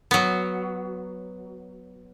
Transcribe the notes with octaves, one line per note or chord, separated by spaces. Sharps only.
F#3 B3